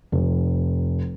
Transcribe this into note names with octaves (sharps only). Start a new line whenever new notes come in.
F1